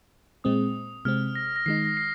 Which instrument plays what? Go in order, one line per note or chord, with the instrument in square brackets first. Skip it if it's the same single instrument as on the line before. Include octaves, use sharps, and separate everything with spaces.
[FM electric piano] A#2 G#3 C4 [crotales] D#6
[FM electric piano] C3 G#3 C4 [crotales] F6
[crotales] A#6
A#6
[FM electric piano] D#3 G#3 D#4 [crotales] C7
[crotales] A#6
C7